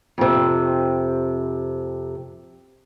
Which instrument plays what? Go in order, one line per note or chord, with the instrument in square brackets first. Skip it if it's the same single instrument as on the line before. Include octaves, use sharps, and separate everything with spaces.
[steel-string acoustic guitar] F2 C3